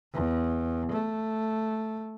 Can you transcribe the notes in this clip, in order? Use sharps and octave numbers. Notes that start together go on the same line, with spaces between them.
E2
A3